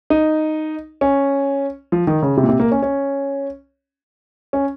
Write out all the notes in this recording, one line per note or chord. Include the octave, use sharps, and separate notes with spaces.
D#4
C#4
F3
D#3
C#3
C3
A#2
C3
A#3
C#4
C#4
C#4